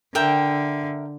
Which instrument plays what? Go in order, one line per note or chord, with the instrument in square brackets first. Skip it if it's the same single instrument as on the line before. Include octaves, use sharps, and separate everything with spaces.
[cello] D3 [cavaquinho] A#4 E5 G5